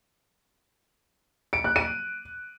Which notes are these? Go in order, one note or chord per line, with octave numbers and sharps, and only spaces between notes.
D7
F#6
D#7